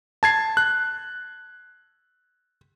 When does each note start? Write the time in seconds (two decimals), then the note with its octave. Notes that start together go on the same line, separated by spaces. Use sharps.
0.23 A5 G#6 C7
0.57 F#6